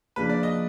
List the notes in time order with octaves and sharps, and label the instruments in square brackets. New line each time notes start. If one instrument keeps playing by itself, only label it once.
[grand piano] C#3 F3 A#3 D4 [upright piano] B4
[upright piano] D5
D#5